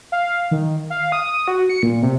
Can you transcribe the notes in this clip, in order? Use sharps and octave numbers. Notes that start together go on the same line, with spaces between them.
F5
D#3
F5
D#6
F#4
C#7
A#2
C3